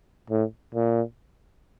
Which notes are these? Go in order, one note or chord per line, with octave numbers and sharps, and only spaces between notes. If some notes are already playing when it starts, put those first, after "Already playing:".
A2
A#2